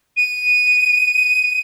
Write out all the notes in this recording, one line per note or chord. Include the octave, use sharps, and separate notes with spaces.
D#7